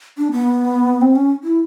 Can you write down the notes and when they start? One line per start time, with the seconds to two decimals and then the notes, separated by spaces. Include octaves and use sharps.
0.18 D4
0.32 B3
1.01 C4
1.16 C#4
1.44 E4